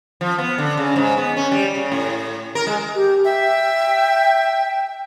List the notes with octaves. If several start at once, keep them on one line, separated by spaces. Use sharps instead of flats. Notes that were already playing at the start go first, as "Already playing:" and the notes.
F3
B3
D3
C#3
G#2
B3
C#4
G3
C#3
A2
A#4
G#3
G4
E5 G5